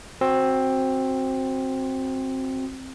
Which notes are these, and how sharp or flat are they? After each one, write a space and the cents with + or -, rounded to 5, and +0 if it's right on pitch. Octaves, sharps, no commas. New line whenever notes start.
C4 +10 F#4 +0